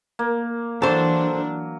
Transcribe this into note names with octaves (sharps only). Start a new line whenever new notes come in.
A#3
E3 F#3 D4 A4 C5